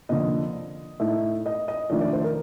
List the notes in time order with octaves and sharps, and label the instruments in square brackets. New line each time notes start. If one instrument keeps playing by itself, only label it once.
[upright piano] F2 D3 F3 A#3 D#5
A2 A3 D#4
D#5
D#5
F2 D#3 A3 D4 D5
D5
C5
A#4